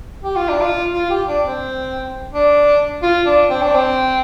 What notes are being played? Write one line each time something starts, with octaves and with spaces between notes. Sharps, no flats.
G4
F4
D4
F4
F4
G4
D4
C4
D4
F4
D4
C4
D4
C4